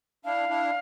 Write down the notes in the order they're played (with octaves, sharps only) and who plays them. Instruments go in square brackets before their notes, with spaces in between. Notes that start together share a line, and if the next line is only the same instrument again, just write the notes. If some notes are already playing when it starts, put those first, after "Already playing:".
[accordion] D4 E4 [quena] F5
[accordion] D4 E4